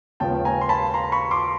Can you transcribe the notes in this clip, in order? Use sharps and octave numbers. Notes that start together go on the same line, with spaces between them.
D#2 C#3 F3 G#3 B3 G5 A5
G#5 A#5
C6
A5 B5
A#5 C6
B5 C#6
C6 D6